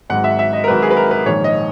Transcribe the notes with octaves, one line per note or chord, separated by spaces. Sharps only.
G#1 G#2 F#3 F#5
E5
E5
D#5
A#4
G#1 G#2 F#3 B4
G#4
B4
A#4
B4
A#1 G#2 D#3 C#5
D#5